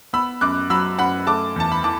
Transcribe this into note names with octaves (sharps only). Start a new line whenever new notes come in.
B3 B5 E6
F#2 D6 F#6
F#3 B5 E6
F#2 F#5 B5
A3 A5 D6
E2 A5
B5
E3 A5 D6